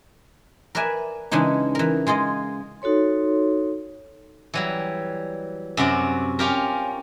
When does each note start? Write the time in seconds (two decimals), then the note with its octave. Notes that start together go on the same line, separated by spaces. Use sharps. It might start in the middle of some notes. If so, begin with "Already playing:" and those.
0.75 A#4 B4 D5 E5 G#5
1.31 C#3 E3 G#3 D4 D#4
1.75 E3 A#4
2.07 G#3 F4 G#4 D#5
2.82 D#4 F#4 A4 C#5 C6
4.54 E3 F#3 G3
5.77 F#2 C3 F#4 D5
6.39 C#4 F4 G4 A#4